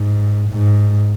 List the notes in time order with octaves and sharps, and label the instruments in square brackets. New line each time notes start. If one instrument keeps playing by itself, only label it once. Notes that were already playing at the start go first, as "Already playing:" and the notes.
Already playing: [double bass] G#2
G#2